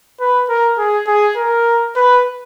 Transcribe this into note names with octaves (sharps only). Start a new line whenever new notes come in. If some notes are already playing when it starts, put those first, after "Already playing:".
B4
A#4
G#4
G#4
A#4
B4